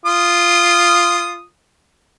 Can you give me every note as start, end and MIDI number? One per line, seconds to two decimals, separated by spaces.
0.06 1.43 65
0.06 1.43 87